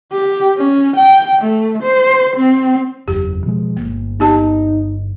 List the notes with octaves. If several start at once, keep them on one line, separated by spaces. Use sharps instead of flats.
G4
C#4
G5
A3
C5
C4
F#1 E2 G4
B2 F3 G#3
G1 A#3
B3 D#4 G4 A5